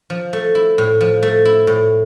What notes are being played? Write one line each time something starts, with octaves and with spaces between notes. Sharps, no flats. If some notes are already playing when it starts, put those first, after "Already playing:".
F3
A3
E4
A2
F3
A3
E4
A2